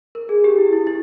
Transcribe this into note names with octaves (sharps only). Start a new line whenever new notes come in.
A#4
G#4
G4
E4
E4
E4